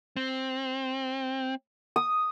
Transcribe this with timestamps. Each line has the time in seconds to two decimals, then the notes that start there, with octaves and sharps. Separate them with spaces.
0.17 C4
1.96 D#6